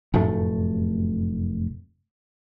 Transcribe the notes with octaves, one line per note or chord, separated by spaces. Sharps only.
F1 F#2 A2 A3